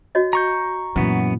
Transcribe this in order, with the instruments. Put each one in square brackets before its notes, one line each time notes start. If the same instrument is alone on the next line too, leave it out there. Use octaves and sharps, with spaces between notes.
[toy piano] F#4 C#5 D#5
[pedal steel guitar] A#5 C#6 G6
[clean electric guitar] F#2 B3 [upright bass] A#2 E3